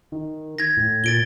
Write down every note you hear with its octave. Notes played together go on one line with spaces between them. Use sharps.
D#3
G#6 A#6
A2
A#2 A6 D7 G7